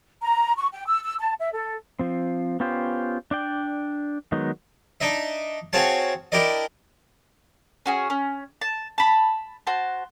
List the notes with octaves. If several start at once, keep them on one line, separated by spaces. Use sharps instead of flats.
A#5
C#6
G5
E6
E6
A5
E5
A4
F3 C4
B3 C#4 F4 G4 C5
D4 D5 G5
D#3 F#3 G#3 B3 D#4
D4 D#4 D#5 E5
C4 F#4 G#4 C#5 F5 A5
D4 E4 G4 A#4 D5 D#5
C#4 F#4 G#4
C#4
A5
A5 B5
F#4 C5 A5